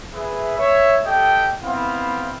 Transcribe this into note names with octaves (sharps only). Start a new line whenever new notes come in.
G#4 B4 E5
C#5 E5
G4 A4 D#5 G5
B3 C4 E4 F5